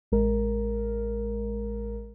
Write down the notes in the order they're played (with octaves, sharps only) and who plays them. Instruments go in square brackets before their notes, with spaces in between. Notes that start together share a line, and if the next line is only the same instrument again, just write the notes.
[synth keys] A1 G#3 A#4